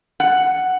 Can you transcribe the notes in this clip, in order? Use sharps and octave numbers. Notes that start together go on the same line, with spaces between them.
F#5